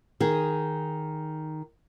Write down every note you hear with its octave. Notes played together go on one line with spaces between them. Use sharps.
D#3 G#4